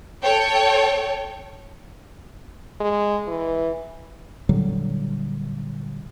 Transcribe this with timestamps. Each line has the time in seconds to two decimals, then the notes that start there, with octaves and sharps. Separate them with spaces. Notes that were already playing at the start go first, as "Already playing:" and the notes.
0.24 A4 C#5 G5
2.81 G#3
3.28 E3
4.49 A#2 D3 F#3 G3